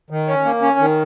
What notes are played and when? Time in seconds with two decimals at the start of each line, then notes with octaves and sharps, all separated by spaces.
0.10 D#3
0.27 C#4
0.45 A#3
0.62 C#4
0.79 D#3